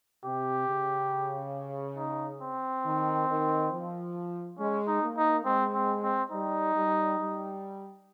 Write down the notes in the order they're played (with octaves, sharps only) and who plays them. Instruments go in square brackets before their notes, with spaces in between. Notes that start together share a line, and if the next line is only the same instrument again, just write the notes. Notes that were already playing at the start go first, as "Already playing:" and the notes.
[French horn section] C3 [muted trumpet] G4
[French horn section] C#3
[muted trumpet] D#4
C4
[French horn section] D#3
D#3
F3
[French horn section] G#3 [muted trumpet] C#4
[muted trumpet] D#4
[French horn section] A#3
[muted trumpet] D#4
[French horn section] G#3 [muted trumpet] C4
[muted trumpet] C4
C4
[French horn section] G3 [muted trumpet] D#4
[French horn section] G3
G3